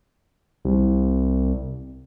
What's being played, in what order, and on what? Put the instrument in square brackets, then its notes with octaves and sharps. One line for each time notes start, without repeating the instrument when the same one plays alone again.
[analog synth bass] C2